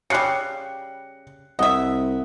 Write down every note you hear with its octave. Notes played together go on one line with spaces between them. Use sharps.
C#3 G3 F#6 C7 C#7
C2 D#5 E5 F#5